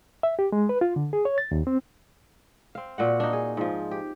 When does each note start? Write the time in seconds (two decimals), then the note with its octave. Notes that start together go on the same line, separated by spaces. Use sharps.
0.23 E5
0.39 G4
0.52 G#3
0.69 B4
0.81 F4
0.96 D3
1.13 G#4
1.25 C#5
1.38 A6
1.51 D#2
1.67 C4
2.75 C4 F5
2.98 A#2 F#4 F#5
3.20 D4 D#4
3.33 G#4
3.57 G#2 F3
3.91 G4